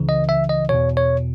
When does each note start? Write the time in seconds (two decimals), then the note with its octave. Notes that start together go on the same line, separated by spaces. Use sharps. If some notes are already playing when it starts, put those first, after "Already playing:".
Already playing: C#2 C#3 E3
0.09 D#5
0.29 E5
0.49 D#5
0.69 E2 B2 C#5
0.97 C#5